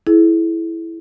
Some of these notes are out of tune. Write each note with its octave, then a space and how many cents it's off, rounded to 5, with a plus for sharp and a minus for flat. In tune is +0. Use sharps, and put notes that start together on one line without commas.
E4 +0 G#4 +40